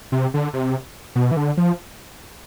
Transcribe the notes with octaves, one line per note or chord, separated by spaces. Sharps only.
C3
D3
C3
B2
E3
D3
F3